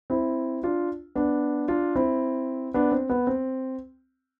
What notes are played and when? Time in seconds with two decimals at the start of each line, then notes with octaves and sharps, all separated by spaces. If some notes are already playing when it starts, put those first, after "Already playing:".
0.10 C4 E4
0.63 D4 F4
1.15 B3 D4
1.68 D4 F4
1.95 C4 E4
2.74 B3 D4
2.92 C4
3.10 B3
3.27 C4